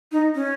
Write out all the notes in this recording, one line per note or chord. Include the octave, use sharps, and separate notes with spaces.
D#4
C#4